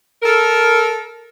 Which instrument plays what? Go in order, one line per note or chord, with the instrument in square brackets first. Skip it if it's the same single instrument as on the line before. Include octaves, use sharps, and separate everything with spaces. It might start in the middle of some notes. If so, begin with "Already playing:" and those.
[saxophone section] A4 A#4